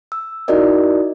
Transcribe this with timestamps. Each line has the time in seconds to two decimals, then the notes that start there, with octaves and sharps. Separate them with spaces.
0.12 E6
0.48 D#4 E4 F#4 A#4 D5 D#5